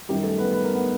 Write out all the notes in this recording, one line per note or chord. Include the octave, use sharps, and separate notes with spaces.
F#2 D#3 G3 G4
A3 A4
B3 B4
B4
A#4
B3 B4